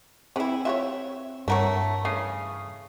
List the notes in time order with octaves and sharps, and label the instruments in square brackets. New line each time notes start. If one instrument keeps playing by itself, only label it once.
[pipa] E3 E4 [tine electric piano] C4 [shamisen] G#4 B4 B5
[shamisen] F4 G4 C#5 [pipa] E5
[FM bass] G2 [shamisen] E3 F#5 [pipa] A3 A#4 C#5
[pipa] C#3 [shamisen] E3 A3 [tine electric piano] C#6 D#6 C7